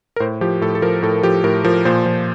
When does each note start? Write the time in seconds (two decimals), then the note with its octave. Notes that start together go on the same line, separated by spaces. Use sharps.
0.16 A#4
0.20 A2 C5
0.41 F3 G4
0.61 A2 A4
0.75 A4
0.82 F3 A#4
1.03 A2 A4
1.23 F3 G4
1.44 A2 A#4
1.64 F3 A#4
1.85 A#2 C5
2.06 F3